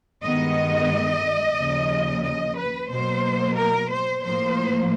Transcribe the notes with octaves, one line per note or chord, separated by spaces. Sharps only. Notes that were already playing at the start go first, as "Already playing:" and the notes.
G2 D#3 G#3 B3 D#5
D#2 C#3 F3
D#5
B4
B2 F#3 A#3 C5
A#4
C5
A2 F3 A#3 C5